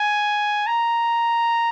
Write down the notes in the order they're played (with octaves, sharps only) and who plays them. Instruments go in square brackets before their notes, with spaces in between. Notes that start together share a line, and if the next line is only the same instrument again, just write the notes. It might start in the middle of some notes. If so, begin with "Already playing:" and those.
Already playing: [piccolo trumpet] G#5
A#5